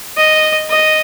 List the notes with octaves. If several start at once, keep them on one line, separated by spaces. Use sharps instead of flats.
D#5
D#5